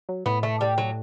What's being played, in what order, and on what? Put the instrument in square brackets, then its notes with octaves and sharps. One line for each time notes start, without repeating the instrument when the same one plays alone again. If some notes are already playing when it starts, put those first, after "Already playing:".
[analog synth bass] F#3
[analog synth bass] A2 [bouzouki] B3
[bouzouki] A3
G3
F#3